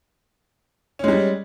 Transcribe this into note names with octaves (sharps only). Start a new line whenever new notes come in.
G3 G#3 C#4